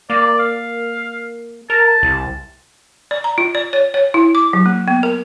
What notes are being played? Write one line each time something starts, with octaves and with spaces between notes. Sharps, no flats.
A#3 D5
F5
A#4 A5
C2
D5
A#5
F4
D5
C#5
C#5
E4
D6
F#3
A#3
B3
A#4